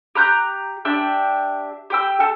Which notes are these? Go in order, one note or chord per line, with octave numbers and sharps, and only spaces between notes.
G4 A#5 F#6 G6
D4 G4 E5 G5
G4 G5 E6
A4 A5